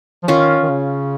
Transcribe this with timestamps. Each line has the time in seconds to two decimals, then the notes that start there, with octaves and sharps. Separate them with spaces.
0.23 F3
0.28 D#3 C#4 F4
0.62 D#3
0.69 C#3